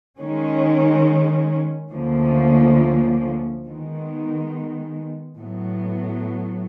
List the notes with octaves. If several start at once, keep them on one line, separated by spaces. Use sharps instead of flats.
D#3 G#3 C#4
D2 D3 F3 A#3 C#4
D#3 G#3 B3
A2 F#3 B3